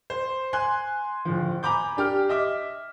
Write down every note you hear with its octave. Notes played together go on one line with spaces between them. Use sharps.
C5
G#5 C6 F#6
D1 F3
G#5 A#5 B5 D6 G6
D4 G4 F6
D#5 E5 D6